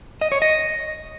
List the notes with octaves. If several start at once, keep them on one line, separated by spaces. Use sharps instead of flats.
D#5
C#5
D#5